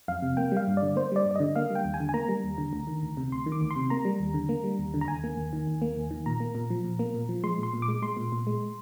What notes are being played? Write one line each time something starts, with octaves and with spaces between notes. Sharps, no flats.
F2 F5
C3
A#3 G5
G3 F5
G2
D5
D3
A#3 C5
G3 D5
G2
D5
D3 D#5
A#3 F5
G3
G5
D#2
G#5
D3
G#5
A#3 A#5
G3
D#2
D3
D2
D#3
D2
C3
D2 C6
D#3
D6
D2
C6
C3
A#3 A#5
G3
D#2
D3
A#3
G3
D#2
D3
A#5
D#2 G#5
A#3
D#2
D#3
D#2
A#3
D#2
D#3
A#2 A#5
A#3
A#2
F3
A#2
A#3
A#2
F3
G#3 C6
A#2
C6
A#2
D6
G#3
G#3 C6
A#2
A#2
G#3